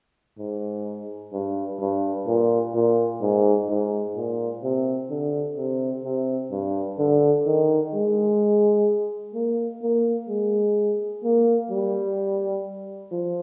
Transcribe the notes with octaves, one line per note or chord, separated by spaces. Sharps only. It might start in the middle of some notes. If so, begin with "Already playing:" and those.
G#2
G2
G2
A#2
A#2
G#2
G#2
A#2
C3
D3
C3
C3
G2
D3
D#3
G#3
A#3
A#3
G#3
A#3
G3
F3